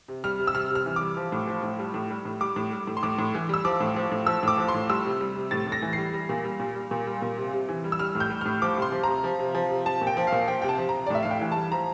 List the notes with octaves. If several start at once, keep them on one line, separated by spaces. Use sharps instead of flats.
C3
G3 F6
C3
E6
C3 F6
C3 F6
E3
G3 D6
F3
A2
F3
A2
G3
A2
G3
A2
G3 D6
A2
G3
A2
C6
A2 D6
A2
E3
G3 E6
F3 D6
A2
F3
A2
F3 E6
A2 D6
F3
C6
A2
G3 E6
C3
G3
C3
A2 A6
A2
A#6
E3
G3 C7
G3
A#2
G3
A#2
G3
A#2
G3
A#2
C3
C3
E3
G3
E6
G3 F6
A2
G6
G3
A2 F6
F3 D6
C3 C6
F3
C3 A#5
F3
C3
F3
C3
F3 A5
A#2
G5
F3
F5
A#2
F3 G5
C3 G5
A5
F3
A#5
C3
D5
A2 E5
A2 F5
G5
E3
G3 A5
F3 A#5